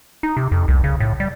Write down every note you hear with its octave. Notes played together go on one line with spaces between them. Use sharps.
D#4
C3
F2
C2
C#3
A2
G3